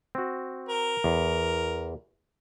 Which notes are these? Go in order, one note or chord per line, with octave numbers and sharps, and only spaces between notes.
C4 F#4
A#4
E2